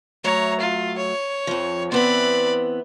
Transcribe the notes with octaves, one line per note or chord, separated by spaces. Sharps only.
F#3 A3 C#5 A#5
F4
C#5
F2 F3
E3 B3 C4 D5 B5